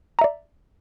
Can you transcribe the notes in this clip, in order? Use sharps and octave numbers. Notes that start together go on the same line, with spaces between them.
D5 E5 A#5